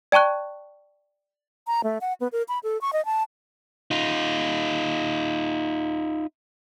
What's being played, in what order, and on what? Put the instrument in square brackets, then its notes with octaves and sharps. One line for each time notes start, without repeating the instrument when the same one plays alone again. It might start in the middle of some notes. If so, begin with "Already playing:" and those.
[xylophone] D5 G5 A5 C#6 F#6
[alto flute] A#5
A3
F#5
B3
A#4
B5
A4
C#6
D#5
A5
[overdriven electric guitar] D#4 F4